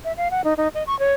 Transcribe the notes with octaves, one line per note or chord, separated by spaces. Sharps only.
E5
F5
F#5
D#4
D#4
D#5
C#6
C#5